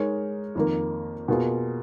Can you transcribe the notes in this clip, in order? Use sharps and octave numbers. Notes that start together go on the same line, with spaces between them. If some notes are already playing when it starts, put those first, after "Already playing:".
Already playing: G#3 D#4 A#4 C#5
F2 D#3 A#3
B2 A#3 F4 G#4